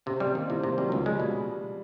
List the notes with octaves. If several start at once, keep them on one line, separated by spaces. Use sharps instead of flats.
C3 C#4
G3 C4
D#3 A#3
C3 E3
C3 D#3
F#3 G3
C#2 F3
G#3
G3
B2